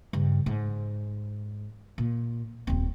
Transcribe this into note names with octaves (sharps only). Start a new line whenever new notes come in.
G2 C#3
G#2
A#2
D#1 C4